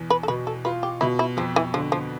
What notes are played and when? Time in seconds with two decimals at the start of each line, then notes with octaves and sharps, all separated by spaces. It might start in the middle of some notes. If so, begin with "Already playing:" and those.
Already playing: E2 B2
0.10 B4
0.23 A4
0.28 B2 B4
0.47 A4
0.65 F4 B4
0.83 G4
1.01 B2 E4
1.19 E4
1.37 F2 F3
1.56 E3
1.74 D3 F3
1.92 F3